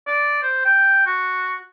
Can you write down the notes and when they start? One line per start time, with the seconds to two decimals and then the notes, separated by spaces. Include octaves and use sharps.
0.07 D5
0.42 C5
0.65 G5
1.06 F#4